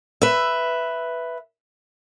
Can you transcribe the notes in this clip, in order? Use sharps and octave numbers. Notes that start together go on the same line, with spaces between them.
B4 E5